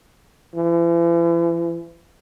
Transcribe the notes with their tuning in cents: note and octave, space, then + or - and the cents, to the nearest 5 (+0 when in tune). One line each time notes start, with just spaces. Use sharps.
E3 +40